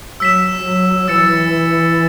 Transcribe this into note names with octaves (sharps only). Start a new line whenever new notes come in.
F#3 E6 B6 E7
F#3
E3 E6 A6 C#7 E7